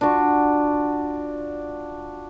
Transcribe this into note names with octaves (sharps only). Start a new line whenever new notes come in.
D4 F4 F#4 C#6